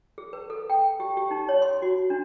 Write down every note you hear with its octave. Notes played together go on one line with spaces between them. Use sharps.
G#4
B4
A4
G5
G4
G4
D#4
C#5
C6
F#4
D4